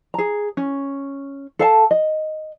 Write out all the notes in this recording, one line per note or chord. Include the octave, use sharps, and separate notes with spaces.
G#4 A#5
C#4
A4 F5 A5
D#5